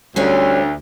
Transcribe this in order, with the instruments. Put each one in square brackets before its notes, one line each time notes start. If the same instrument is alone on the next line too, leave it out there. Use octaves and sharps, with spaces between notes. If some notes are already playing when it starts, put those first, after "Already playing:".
[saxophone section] D2 [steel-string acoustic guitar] G3 C#4 G#4